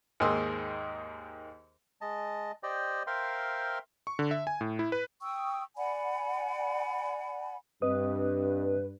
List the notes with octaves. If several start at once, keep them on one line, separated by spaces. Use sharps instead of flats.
D#2 G#2 A#3 G#4 C6 E6
G#3 D#5 A5
G4 C5 D5 D#5 G5
A#4 C5 E5 F5 G5 C6
C#6
D3
E5
G#5
A2
E4
B4
G5 C#6 D#6 E6
D5 F#5 G#5 B5
G2 C4 B4 D#5 D#6